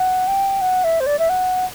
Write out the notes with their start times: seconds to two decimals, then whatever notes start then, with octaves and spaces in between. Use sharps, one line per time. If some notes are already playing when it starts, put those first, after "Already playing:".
Already playing: F#5
0.28 G5
0.61 F#5
0.84 E5
1.00 C5
1.06 D5
1.19 E5
1.29 F#5